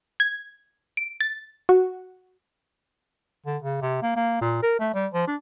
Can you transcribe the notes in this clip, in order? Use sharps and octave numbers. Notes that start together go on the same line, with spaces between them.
G#6
D7
A6
F#4
D3
C#3
C3
A#3
A#3
A#2
A#4
A3
G3
F3
D4